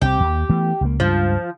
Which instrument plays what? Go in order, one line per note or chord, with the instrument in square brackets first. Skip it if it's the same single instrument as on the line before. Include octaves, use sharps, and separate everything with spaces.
[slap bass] C2 C4 [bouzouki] G4
[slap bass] D#2
E3 A3 B3
C#2 A#3
[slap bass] C#2 G2 [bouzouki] F3